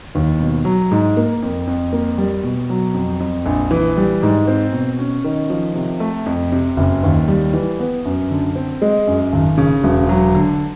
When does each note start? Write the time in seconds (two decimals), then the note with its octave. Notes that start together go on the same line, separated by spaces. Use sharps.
0.15 D#2
0.40 B2
0.65 F#3
0.91 G#2
1.17 A#3
1.42 F2
1.67 F2
1.93 A#3
2.18 G3
2.43 B2
2.70 F#3
2.94 F2
3.20 F2
3.46 A#1
3.71 E3
3.97 G3
4.23 G#2
4.48 C4
4.73 B2
4.99 C#4
5.24 D#3
5.50 F3
5.75 C3
6.00 A3
6.26 F2
6.52 C3
6.77 F#1
7.03 D#2
7.28 G3
7.54 E3
7.80 B3
8.05 F#2
8.31 D3
8.56 C4
8.82 G#3
9.07 F#2
9.33 G#1
9.58 C#3
9.84 E1
10.09 F#3
10.35 D3